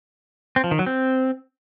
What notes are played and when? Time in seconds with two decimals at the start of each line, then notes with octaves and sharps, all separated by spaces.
0.56 C4
0.64 F3
0.71 D#3
0.79 F#3
0.86 C4